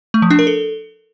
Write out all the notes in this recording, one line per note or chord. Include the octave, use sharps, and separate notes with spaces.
A3
F3
D4
A#4
A4